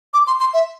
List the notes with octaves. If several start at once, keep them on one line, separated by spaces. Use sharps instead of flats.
D6
C6
C6
E5